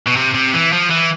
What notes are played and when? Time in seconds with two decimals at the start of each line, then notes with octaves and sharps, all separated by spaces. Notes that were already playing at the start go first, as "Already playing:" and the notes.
0.07 B2
0.16 C3
0.35 C3
0.54 E3
0.73 F3
0.91 E3